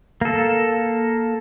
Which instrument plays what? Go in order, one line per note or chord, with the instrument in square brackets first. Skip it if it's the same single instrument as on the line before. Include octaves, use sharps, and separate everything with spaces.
[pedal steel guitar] A#3 A4